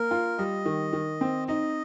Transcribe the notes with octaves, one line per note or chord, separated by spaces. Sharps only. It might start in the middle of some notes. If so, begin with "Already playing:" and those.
Already playing: A#3 A#4
F4
G3 D#5
D#3
D#3
C4
D#4 D#5